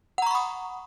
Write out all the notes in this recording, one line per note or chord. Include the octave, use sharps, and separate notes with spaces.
F#5 A#5 B5 C#6 D#6